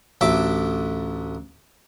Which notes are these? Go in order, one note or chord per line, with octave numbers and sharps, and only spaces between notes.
A1 D2 E5 D6